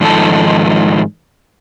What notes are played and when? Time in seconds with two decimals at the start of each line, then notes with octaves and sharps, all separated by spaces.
0.01 G#2 D#3 F3 D#4 A4 A5